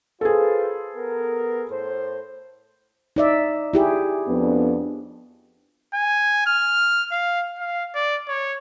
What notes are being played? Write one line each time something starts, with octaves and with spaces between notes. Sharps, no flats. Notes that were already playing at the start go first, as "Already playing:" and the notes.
F4 G#4 A4 B4 C5
B3 A#4
A2 A4 C5
D#4 D5 E5
E4 G4 G#4
F2 B3 D4
G#5
F6
F5
F5
D5
C#5